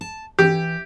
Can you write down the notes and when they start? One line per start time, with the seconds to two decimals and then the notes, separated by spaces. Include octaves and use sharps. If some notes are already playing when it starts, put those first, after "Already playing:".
0.01 A5
0.39 E3 G4